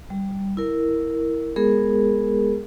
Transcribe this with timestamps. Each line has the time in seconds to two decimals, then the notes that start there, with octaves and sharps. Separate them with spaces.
0.10 G3
0.57 E4 A#4
1.56 G#3 B3 G#4 A#4